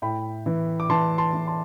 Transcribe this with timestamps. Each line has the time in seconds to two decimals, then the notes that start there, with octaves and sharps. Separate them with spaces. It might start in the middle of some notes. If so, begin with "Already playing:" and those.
0.02 A2 G5 B5
0.46 E3
0.80 D6
0.90 E3 A5 C6
1.18 A5 C6
1.33 E3
1.47 A5 C6